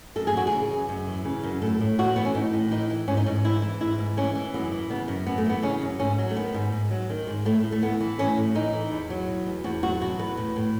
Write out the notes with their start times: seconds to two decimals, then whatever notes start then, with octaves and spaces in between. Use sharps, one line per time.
0.16 F#2 A4
0.27 G#4
0.34 E3 F#4
0.47 G#4
0.52 C#3
0.71 F#2
0.89 F#2
1.07 E3
1.25 C#3
1.43 F#2
1.62 A2 A4
1.81 A2
1.98 E3 F#4
2.16 E3 B3
2.25 C#4
2.35 A2 D#4
2.53 A2
2.71 E3 D#4
2.90 E3
3.08 G#2 C#4
3.17 D#4
3.26 G#2 C#4
3.44 E3 E4
3.62 E3
3.81 G#2 E4
3.99 G#2
4.17 E3 C#4
4.35 E3
4.54 F#2 B3
4.72 E3
4.90 C#3 B3
5.08 F#2
5.27 F#2 B3
5.38 A3
5.45 E3 B3
5.63 C#3 C#4
5.82 F#2
5.99 G#2 C#4
6.18 F#3
6.30 A3
6.36 D#3 B3
6.54 G#2
6.72 G#2
6.91 F#3
7.10 D#3
7.27 G#2
7.45 A2 A3
7.64 A2
7.72 A3
7.82 E3 B3
8.00 E3
8.18 A2 C#4
8.37 A2
8.55 E3 D#4
8.73 E3
8.91 E2
9.10 F#3
9.28 B2
9.46 E2
9.64 E2 F#4
9.83 F#3 F#4
10.01 B2 F#4
10.19 E2 B4
10.37 A2
10.56 A2